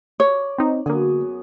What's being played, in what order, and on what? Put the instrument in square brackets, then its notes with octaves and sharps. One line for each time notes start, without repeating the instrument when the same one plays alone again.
[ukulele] C#5 [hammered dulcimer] D5
[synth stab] C4 D#4
[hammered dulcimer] F#2 B3 G#4 [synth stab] D3 A#3